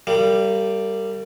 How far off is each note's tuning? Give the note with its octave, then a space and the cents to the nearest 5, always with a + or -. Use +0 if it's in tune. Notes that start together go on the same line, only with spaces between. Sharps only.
G3 +0 A#3 -35